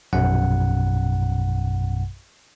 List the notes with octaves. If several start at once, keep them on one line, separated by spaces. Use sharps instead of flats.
A#1 F#2 B2 F#5